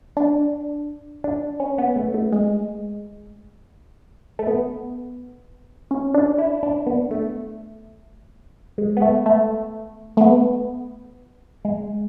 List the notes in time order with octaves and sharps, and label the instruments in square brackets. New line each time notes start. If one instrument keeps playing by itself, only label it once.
[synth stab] D4
D4
C#4
B3
A3
A3
G#3
A3
B3
C#4
D4
E4
D4
B3
A3
G#3
B3
A3
A3
A3
B3
G#3